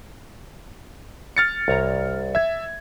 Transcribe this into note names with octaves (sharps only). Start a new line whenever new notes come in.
F6 A6 C#7
C2 C#5 A#5
E5 G#6